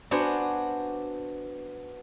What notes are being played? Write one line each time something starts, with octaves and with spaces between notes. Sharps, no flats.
B3 D4 F#4 C5 G#5